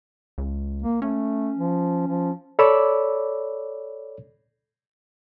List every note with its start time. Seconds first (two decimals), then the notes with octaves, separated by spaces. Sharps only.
0.38 C#2
0.82 A#3
1.02 A3 C#4
1.58 F3
2.08 F3
2.59 A4 C#5 D5 B5 D6 E6